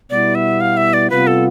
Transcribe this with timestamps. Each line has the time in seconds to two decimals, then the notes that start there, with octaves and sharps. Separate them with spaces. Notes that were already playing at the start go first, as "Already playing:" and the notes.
0.10 B2 G3 B3 E4 D5
0.35 E5
0.61 F5
0.77 E5
0.94 D5
1.10 C3 G3 B3 F4 B4
1.27 A4